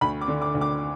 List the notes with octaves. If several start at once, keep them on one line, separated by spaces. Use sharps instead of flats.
D2 B5
D6
D3
D6
D2
D6